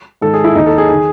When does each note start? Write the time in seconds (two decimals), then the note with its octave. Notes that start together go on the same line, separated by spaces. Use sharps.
0.21 G#2 D#3 A4
0.33 G#4
0.44 E4
0.55 D#2 D#3 D#4
0.66 A4
0.78 G#4
0.89 D#3 G#4